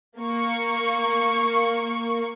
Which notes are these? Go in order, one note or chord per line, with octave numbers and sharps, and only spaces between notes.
A#3 C#6